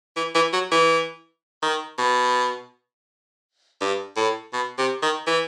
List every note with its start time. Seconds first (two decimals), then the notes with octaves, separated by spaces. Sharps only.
0.16 E3
0.35 E3
0.53 F#3
0.71 E3
1.62 D#3
1.98 B2
3.81 G2
4.16 A2
4.53 B2
4.78 C3
5.02 D#3
5.27 E3